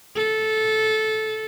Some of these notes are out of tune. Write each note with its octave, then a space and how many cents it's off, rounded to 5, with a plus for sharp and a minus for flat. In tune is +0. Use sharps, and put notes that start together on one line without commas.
A4 -15